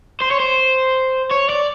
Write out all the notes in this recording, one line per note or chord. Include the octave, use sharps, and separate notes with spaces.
C5
C#5
C5
C#5
D5